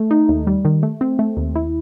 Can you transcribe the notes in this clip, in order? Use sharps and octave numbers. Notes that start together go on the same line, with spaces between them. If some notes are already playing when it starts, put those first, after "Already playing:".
Already playing: A3
D#4
D#2
G3
D#3
A3
C4
A3
D#2
E4